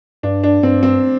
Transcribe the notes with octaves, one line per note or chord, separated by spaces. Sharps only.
G2 D4
D4
G2 C4
C4